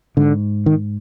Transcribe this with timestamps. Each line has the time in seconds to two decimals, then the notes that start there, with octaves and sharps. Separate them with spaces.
0.17 G#2 D3
0.66 D#3